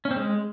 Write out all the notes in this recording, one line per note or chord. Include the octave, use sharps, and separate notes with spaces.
C#4
C4
G#3